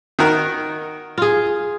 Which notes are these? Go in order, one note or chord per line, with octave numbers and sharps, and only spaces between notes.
D#3 F#4 A#4
F4 G#4